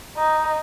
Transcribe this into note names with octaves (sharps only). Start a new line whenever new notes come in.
D#4